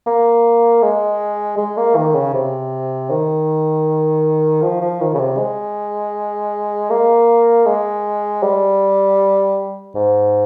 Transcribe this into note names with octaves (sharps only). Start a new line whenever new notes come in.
A#3
G#3
G#3
A#3
D#3
C#3
C3
D#3
F3
F3
D#3
C#3
C3
G#3
A#3
G#3
G3
G#2